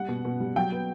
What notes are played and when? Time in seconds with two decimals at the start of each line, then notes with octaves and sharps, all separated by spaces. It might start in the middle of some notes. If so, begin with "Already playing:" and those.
Already playing: G3 F#5
0.08 B2
0.25 B2
0.40 G3
0.56 F#3 G5
0.72 B3